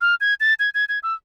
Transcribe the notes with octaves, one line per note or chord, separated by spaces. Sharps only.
F6
G#6
A6
G#6
G#6
G#6
E6